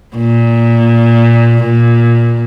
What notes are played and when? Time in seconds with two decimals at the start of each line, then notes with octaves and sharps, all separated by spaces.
0.16 A#2
1.64 A#2